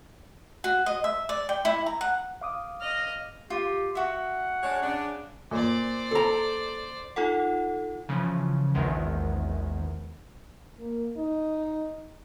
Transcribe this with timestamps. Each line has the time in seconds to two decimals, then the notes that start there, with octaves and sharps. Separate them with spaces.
0.64 F#4
0.86 D#5
1.04 E5
1.29 D5
1.49 G5
1.65 E4
1.86 A#5
2.01 F#5
2.41 F5 D6 D#6
2.80 D#5 F6
3.50 F4 G4
3.95 F#4 E5 F#5
4.63 G#3 D4 C#5
4.83 C#3 D4
5.51 A#2 C5 D5
6.11 A4 A#5
7.16 D#4 F4 A4 F#5
8.09 C#3 E3 F3
8.75 A#1 E2 D#3 G#3
10.79 A#3
11.17 D#4